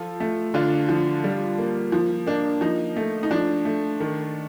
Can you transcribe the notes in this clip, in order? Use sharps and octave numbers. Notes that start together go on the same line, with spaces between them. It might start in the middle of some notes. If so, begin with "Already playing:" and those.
Already playing: F3 F4 A4
A3
D3 D4 F4
F3
G3
A#3
F3
A#3 D4
F3 D#4
A3
D#4
F3 D4
A3
D#3